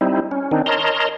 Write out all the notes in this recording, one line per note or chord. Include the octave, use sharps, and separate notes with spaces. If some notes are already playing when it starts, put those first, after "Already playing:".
G3 C4 D#4 E4
C#4
D#3 C4 D4 D#4
A#4 C#5 D#5 A5 A#5 C6